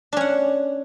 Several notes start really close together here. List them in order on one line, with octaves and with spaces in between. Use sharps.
D4 C#4 F#5